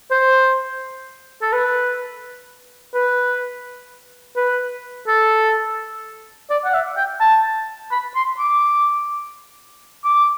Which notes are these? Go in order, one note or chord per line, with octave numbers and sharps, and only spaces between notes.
C5
A4
B4
B4
B4
A4
D5
F#5
E5
G5
A5
B5
C6
D6
D6